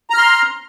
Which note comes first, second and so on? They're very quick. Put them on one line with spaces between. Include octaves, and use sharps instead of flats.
A#5 F6 C6